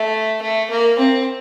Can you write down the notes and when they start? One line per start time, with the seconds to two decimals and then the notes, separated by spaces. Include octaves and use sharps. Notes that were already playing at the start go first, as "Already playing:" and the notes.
Already playing: A3
0.42 A3
0.70 A#3
0.98 C4